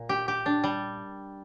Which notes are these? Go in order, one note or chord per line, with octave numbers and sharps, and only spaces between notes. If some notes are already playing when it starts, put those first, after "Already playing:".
Already playing: A#2
G4
G4
D4
G3